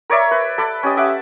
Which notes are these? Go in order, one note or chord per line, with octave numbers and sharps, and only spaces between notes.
A#4 C#5 D5 E5
B4
A4 B5 D6
C#4 G4 D#5
E5 F#5 D6